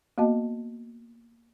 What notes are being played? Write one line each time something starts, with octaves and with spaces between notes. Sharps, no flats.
A#3 B3 F#4 D#5 A5